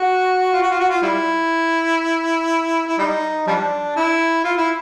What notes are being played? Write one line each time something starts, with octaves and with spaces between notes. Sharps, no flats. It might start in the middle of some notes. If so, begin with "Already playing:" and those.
Already playing: F#4
F4
F#4
F4
F#4
F4
G3 E4
E4
G3 D#4
F3 G3 D4
E4
F4
E4